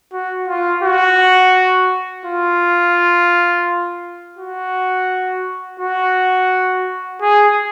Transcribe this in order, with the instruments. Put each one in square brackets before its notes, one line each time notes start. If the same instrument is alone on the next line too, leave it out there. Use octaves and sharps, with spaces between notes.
[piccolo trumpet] F#4
F4
F#4
F4
F#4
F#4
G#4